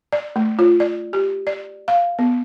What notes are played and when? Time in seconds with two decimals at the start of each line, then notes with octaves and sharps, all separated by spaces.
0.12 D5
0.36 A3
0.59 F4
0.80 D5
1.13 G4
1.47 D5
1.88 F5
2.19 B3